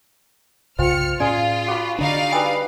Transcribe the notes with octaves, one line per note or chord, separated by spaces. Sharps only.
C2 G2 C#3 F4 C5 G5 F6 C#7
A2 C#4 F4 G#4 D5 G#5
F#4 G#4 B5
D3 D4 D#4 D5 F5
G3 B4 G#5 D#6 E6